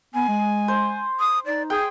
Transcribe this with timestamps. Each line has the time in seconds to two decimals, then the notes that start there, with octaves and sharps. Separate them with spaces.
0.14 B3 G#5
0.28 G#3
0.68 C5
1.20 D#6
1.46 D#4 D5
1.70 G#4 G5